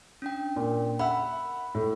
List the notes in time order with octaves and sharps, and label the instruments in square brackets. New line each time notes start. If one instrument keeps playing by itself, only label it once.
[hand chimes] C#4 D4 G5
[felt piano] A#2
[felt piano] E5 F#5 [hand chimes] B5 E6
[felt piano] A2